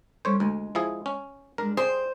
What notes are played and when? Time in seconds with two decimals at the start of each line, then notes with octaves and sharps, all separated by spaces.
0.25 G3 C#4 A4 C5 C#5
0.40 D2 G#3 G#5
0.75 F3 E4 G#4
1.06 C#4
1.58 G#3 D4 A#4
1.77 G#4 C5 D5 G5